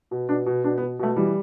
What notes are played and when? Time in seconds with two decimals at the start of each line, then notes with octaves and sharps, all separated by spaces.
0.11 B2
0.29 B2 D4
0.46 B2
0.64 B2 D4
0.78 B3
0.82 B2
0.99 B2 A3
1.16 E3 G3